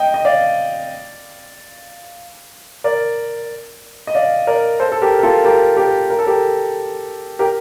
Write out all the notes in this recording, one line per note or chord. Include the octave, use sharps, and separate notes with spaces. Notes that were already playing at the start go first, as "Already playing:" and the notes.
Already playing: D#5 G5
D#5
D5 F5
A#4 D5
D#5
D5 F5
A#4 D5
A4 C5
A4
G4 A#4
A#4
F4 A4
G4 A#4
G4 A#4
A#4
A4
G4 A#4
G4 A#4